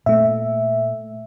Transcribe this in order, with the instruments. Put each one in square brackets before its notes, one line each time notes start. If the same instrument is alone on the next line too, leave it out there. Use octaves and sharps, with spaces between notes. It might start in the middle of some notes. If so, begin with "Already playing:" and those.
[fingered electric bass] A#2 [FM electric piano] A3 E5